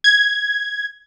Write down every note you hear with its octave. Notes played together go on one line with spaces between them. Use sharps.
G#6